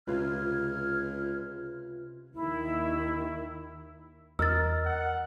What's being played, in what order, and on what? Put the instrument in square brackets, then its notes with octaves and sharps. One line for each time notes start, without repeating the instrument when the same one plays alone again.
[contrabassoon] C#2 [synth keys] C3 F4 B4 [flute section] F6 G#6
[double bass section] D#2 D#3 [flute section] E4
[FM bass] E2 [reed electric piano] A#4 D#5 [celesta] E6 F6 A6
[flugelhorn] F#5